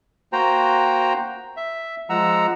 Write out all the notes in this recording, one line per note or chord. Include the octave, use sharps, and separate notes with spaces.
A#3 F#4 C5 G5 A#5
E5
F3 G#3 F#5 A#5 E6